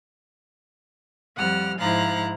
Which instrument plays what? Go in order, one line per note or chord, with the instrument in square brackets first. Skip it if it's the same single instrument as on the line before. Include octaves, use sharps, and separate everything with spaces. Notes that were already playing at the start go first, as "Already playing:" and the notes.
[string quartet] F2 G3 F#5 F6
G#2 F3 E4 F5 A#5 F#6